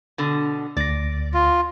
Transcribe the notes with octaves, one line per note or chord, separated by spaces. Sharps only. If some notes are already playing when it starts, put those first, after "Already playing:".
B2 D3
D2 D5 A#6
F4